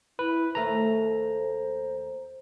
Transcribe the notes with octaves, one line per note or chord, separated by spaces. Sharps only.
E4 B4
D#2 A3 C5 F5 A#5